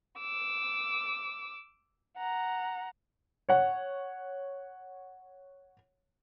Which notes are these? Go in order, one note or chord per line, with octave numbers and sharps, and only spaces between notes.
D6 E6
F#5 A#5
C#5 F#5